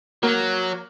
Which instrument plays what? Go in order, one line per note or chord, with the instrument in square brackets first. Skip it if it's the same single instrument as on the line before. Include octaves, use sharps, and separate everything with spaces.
[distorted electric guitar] F#3 [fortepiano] A#3